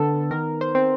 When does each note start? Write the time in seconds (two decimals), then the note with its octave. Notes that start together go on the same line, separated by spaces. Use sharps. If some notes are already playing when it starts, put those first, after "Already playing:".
Already playing: D3 B3 A4
0.31 D#3 A#4
0.61 C5
0.75 C4